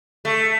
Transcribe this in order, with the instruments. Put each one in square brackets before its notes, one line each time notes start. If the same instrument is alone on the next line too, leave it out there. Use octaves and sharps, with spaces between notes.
[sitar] A3